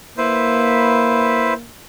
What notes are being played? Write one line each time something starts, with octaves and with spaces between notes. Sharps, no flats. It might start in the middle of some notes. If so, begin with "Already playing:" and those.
A#3 E4 B4 C5